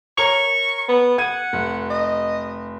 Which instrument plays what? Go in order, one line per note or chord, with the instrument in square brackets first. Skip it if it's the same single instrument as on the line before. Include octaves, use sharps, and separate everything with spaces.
[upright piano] A#4 C#5 F7 [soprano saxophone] C#6
[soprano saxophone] B3
[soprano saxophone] F#5 [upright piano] G#6 D#7
[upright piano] F1
[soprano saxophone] D#5